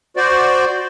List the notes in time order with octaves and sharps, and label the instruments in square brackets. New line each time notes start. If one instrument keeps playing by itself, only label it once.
[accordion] F#4 C5 D5